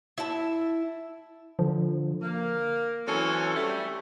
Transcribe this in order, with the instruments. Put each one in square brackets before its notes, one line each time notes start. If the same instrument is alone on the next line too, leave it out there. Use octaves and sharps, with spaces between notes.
[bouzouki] E4 E5 A5
[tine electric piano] D3 [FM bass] F3
[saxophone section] A#3
E3 F#3 C4 C#4 A4
G3 A3